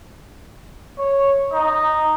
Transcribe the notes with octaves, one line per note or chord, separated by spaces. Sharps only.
C#5
D#4